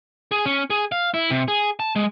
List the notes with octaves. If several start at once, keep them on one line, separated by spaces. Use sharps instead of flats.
G#4
C#4
G#4
F5
E4
C3
G#4
A5
G#3